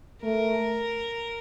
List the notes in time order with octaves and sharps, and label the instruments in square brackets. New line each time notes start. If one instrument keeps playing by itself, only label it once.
[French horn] A3 [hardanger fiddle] A#4